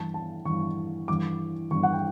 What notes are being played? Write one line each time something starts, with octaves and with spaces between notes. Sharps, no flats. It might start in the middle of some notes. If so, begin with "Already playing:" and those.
Already playing: G2 E3 A5
A5
G2 E3 C#6
G2 E3 D6
G2 E3 C#6
F#5
G5